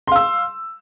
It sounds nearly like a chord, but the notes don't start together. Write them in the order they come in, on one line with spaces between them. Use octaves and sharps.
C6 F5 E6